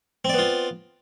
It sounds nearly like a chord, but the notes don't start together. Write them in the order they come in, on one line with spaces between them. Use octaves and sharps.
C4 D5 B3 F4